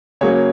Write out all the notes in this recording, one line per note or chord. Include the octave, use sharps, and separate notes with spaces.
C#3 F#3 A#3 C#5